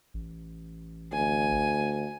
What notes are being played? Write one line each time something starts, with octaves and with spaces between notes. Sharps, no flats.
A1
D2 G#5